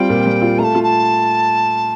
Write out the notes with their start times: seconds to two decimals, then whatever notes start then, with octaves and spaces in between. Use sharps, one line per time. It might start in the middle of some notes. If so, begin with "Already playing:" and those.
Already playing: G3 C4 F4 G5
0.10 A#2
0.26 G3
0.42 F4
0.58 A3 A5 A#5
0.75 F4
0.83 A5